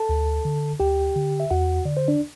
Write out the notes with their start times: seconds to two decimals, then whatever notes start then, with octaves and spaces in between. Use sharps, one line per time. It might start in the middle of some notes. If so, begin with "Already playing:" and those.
Already playing: A4 A5
0.09 D2
0.45 D3
0.80 D2 G4 G5
1.16 D3
1.40 E5
1.51 E2 F#4 F#5
1.85 D3 D5
1.97 C5
2.08 D4 D5